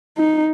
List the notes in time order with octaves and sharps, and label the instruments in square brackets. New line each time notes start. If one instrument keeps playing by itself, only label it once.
[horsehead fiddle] D#4